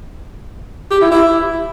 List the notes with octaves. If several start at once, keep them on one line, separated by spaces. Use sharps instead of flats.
G4
E4
E4